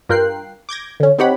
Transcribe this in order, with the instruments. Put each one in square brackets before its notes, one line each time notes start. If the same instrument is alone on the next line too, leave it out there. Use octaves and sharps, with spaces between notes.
[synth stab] G2 F4 A#4 G5 F#6 C7
D6 G6 G#6 A#6
D3 C#4
C4 D#4 G4 C#5 F#5 B5